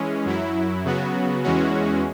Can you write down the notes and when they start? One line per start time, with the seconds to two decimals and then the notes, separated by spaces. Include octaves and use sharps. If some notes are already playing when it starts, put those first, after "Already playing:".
Already playing: E3 G#3 C#4
0.25 F#2 F#3 E4
0.85 C#3 F#3 B3 F#4
1.44 E2 E3 G#3 C#4 F#4